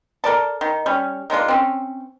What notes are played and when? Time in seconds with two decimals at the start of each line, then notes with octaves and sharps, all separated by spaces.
0.24 A4 A#4 D5 A5
0.61 D#3
0.86 G3 C#4
1.30 D#3 G#3 D4 F4
1.48 C4 C#4